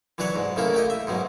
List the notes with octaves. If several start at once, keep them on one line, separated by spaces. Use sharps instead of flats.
E3 F#3 D4 B4 C#5
G#2
C#3 A3 A#3 E4
A3 G4 D#5
E5
G#2 B2 F#3